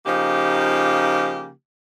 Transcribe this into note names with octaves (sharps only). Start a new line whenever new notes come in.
C#3 F3 A#3 D#4 G4